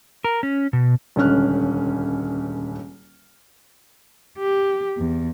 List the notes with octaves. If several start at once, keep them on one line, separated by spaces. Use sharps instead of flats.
A#4
C#4
B2
D#1 C#2 D3 C#4 F6 F#6
G4
E2